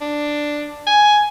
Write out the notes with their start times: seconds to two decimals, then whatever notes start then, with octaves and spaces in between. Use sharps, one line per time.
0.01 D4
0.87 G#5